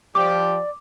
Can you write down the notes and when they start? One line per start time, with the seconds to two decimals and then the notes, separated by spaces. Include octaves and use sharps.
0.15 F3 G4 D5 D6